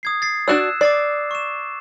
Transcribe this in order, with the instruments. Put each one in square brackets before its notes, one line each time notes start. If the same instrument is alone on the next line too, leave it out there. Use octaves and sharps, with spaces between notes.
[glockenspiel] D#6 G#6 C7
A6 C7
[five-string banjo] D4 F#4 D5 [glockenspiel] E6 F#6 E7
[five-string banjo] D5 [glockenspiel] D6 A6 C7
[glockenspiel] C#6 E7